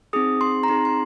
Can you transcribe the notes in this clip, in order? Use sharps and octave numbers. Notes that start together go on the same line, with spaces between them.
C4 D#4 G#4 D#6
C6
A#5
C4 D#4 G#4 C6
C6